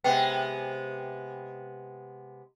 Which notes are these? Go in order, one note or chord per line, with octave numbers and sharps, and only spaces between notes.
C3 G#3 B3 G5